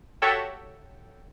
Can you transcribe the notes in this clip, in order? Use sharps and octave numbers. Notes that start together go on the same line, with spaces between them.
F#4 G4 A4 C#5 E5 G5